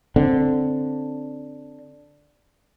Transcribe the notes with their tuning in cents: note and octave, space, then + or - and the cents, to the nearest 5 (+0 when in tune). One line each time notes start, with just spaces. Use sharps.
D3 +0 C4 +0